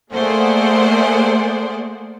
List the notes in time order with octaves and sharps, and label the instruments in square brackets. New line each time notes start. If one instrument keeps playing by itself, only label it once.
[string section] A3 A#3 G#4 C5 D5 F#5